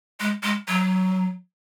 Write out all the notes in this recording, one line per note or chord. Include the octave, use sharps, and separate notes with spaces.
G#3
G#3
F#3